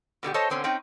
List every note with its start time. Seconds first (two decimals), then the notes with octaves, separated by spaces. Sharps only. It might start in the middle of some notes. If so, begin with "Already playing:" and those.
0.23 B2 D3 D#4 G4
0.34 A4 C5 C#5 D#5 A5
0.50 B2 D3 C4 C#4
0.64 C4 C#4 D#4 G5